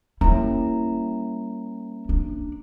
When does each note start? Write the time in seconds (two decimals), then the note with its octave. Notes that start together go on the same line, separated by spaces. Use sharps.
0.21 G3 A#3 C#4 E4 A#5
2.09 D4